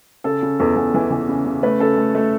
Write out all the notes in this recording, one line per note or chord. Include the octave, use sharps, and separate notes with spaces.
C#3 A4
C#3
E2 A4
E2
E3
E3
C#3
C#3
A3 B4
C#3 A4
A3
A3